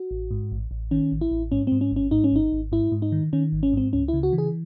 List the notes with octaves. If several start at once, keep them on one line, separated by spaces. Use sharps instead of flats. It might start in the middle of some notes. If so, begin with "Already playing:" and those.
Already playing: F#4
A1
G#2
A1
A1
D#3 C#4
A1
E4
A1
G#2 C#4
G#2 C4
C#4
G#1 C#4
G#2 D#4
C#4
G#1 D#4
G#1
G#2 E4
G#2
D#4
D#3
D#3 C#4
G#1
C#4
G#2 C4
C#2 C#4
E4
C#3
F#4
E3
G#4